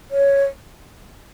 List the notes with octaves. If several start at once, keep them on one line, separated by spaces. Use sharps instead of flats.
C#5